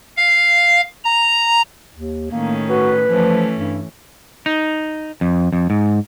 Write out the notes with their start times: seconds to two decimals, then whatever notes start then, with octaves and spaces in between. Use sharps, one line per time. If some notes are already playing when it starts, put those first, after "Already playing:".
0.17 F5
1.05 A#5
1.96 D#2
2.32 A2 D#3 A#3 C#4
2.69 F#4 B4
3.06 E3 F3 A3 C#4
3.56 G2
4.46 D#4
5.21 F2
5.53 F2
5.70 G#2